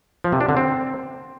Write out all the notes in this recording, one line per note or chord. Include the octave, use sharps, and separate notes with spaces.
F3
C3
D4
D3
C4